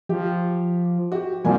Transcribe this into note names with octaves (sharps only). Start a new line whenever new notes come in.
F3 G4
F#4 G4
C2 F3 A#3 G#5